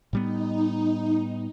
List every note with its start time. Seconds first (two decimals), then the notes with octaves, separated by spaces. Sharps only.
0.13 A2 G3 B3 D#4